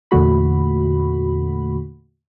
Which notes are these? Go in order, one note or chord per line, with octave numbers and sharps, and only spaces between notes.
E2 A#2 D3 A3 F#4 B5